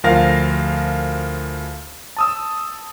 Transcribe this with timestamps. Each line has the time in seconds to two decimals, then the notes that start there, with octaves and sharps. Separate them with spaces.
0.04 D2 F3 A#4 F5 A#6
2.17 A5 D#6 E6